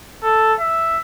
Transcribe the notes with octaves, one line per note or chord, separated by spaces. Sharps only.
A4
E5